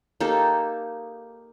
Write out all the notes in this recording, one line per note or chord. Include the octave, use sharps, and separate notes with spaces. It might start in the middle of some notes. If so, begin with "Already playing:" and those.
A#3 D#4 G4 A4